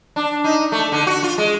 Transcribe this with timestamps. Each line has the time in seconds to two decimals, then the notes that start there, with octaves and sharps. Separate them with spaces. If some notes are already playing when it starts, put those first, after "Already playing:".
0.16 D4
0.44 D#4
0.72 A3
0.92 D3
1.07 F#4
1.23 F4
1.38 G#3